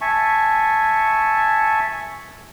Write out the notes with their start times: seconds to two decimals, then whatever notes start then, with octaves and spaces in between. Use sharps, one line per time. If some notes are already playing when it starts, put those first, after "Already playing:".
0.01 E5 G#5 A5 C#6